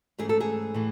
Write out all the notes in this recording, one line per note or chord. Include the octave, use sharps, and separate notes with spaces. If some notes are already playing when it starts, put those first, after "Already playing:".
G#2 E3 A3 C#4 G#4
A4
G#4
A2 E3